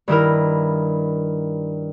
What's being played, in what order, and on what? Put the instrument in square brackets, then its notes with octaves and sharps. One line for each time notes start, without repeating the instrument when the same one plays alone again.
[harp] G2 D#3 E4 A#4